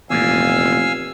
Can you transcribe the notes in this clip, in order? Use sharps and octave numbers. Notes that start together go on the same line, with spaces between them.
F1 E2 A#2 F5 G#5 E6